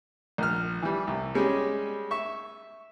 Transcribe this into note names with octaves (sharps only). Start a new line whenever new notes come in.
A#1 F6
E3 G3
C2
G3 G#3 C#4 G4 G#4
E5 C#6